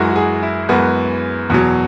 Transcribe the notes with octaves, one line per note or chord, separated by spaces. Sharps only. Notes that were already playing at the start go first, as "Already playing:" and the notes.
Already playing: F#2 E3 G#3 F#4
F#4
G#4
E4
F#2 E3 G#3 B3
E2 B2 F#3